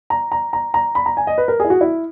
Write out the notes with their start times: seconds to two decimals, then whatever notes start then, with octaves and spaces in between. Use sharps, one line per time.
0.10 A#5
0.32 A#5
0.53 A#5
0.74 A#5
0.95 B5
1.06 A#5
1.17 G#5
1.27 D#5
1.38 B4
1.48 A#4
1.60 E4 G#4
1.70 F#4
1.81 E4